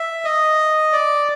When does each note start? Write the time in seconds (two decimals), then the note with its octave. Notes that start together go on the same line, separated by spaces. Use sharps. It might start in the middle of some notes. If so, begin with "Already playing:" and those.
Already playing: E5
0.25 D#5
0.92 D5